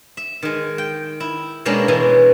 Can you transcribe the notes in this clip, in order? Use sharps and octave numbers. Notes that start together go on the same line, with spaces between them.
E5
D#3 G#3
G5
E4
B2 G#3 A#3 C#4 D4 G4
B2 E3 G#3 C#4